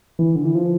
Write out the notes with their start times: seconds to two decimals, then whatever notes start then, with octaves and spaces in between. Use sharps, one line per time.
0.19 E3
0.36 D3
0.45 E3
0.55 F3